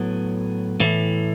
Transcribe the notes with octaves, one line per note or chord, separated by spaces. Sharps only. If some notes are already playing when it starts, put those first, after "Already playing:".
Already playing: A2 F#3 B3
A2 E3